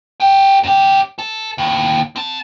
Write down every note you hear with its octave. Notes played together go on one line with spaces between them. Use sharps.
G#4 G5
F#2 G4
A4
D#2 A2
C4 A5